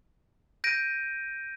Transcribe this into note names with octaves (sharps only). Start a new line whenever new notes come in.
G6 A#6 D7 D#7